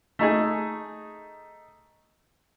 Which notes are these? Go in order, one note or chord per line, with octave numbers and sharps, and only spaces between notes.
A3 D#4 G#4